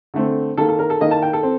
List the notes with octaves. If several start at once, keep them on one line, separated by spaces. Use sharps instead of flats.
D3 A3 C4
D#3 A#3 A4
A4
A#4
A4
D#3 A#3 D#5
A5
G5
A4
C4